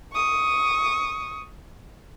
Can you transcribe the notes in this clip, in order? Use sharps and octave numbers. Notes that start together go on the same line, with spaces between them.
C#6 D#6